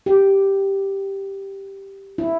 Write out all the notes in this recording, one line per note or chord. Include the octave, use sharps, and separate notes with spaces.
G4
E4